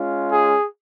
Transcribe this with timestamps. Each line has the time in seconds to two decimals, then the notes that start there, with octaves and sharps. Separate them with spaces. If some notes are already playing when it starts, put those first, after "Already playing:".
Already playing: G#3 C#4 F4
0.31 G#4